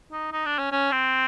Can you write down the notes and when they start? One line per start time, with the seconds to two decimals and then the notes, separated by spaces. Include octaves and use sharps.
0.12 D#4
0.32 D#4
0.46 D4
0.59 C#4
0.72 C#4
0.92 C4